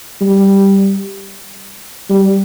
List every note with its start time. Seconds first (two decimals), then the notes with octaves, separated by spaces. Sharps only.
0.21 G3
2.10 G3